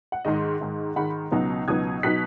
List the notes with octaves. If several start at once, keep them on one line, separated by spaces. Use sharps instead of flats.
F#5
G#2 D#3 G#3 D#5
G#2 D#3 G#3
G#2 D#3 G#3 F#5 B5
C#2 B2 F#3 B3 D#4
C#2 B2 F#3 B3 D#4 D#6 G#6
B2 F#3 B3 D#4 F#6 B6